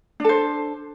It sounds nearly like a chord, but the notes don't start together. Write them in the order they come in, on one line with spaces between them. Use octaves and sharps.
D4 A4 C5